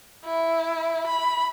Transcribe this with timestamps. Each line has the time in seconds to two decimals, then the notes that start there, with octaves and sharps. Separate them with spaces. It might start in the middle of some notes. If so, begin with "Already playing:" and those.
0.25 E4
1.07 B5